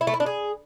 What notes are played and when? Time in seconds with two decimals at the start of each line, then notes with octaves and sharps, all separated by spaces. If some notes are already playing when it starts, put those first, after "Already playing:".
0.01 E4
0.07 A3
0.14 E4
0.20 D4
0.26 G#4